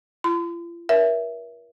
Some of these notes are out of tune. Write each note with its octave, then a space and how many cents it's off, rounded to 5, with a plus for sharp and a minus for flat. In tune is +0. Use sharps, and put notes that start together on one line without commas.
F4 -45 C6 -40
A#4 +40 C#5 +35 E5 +5